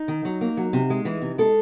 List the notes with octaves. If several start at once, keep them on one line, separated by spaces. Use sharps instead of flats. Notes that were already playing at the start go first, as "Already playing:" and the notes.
Already playing: D#4
D#3
F#3
A#3
F#3
C3
G#3
E3
C3
G#3 A4